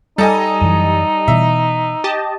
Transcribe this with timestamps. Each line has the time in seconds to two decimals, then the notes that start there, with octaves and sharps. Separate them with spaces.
0.18 G3 D#4 A4 D#5 G#5
0.61 F#2 E3
1.28 B2 E3 E5
2.04 G4 D#5 A5